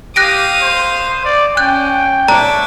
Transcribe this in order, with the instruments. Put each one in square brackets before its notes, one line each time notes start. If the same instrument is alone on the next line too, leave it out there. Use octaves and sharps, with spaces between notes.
[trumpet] G4 [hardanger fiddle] F5 D#6 [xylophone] F#6 A#6 D7
[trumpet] C5
D5
[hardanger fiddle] C#4 [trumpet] G5 [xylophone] F#6
[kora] D4 C#5 [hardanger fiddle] E5 D6 [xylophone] A#5